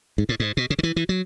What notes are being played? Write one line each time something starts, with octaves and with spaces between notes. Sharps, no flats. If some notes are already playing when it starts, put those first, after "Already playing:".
G#2
A2
G#2
B2
C#3
D3
E3
E3
F#3